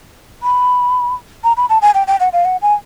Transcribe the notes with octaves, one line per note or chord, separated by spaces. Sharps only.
B5
A#5
B5
A5
G#5
G5
G5
F#5
F5
F#5
G#5